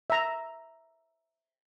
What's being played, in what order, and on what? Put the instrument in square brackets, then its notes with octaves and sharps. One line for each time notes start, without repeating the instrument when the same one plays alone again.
[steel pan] E5 A#5